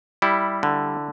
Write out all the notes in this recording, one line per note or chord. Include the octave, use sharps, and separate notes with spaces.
G3 E4
D3